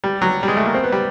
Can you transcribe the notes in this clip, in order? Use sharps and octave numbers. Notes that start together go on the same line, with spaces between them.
G3
F#3
G3
G#3
A3
A#3
C4
B3
G3